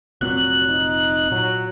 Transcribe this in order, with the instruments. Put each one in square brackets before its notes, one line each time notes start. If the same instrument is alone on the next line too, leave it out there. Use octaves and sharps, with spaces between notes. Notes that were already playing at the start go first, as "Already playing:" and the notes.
[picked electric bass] F1 A#2 C4 [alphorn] F#3 [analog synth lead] F#6
[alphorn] D#4
[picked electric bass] A#2 [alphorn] F#3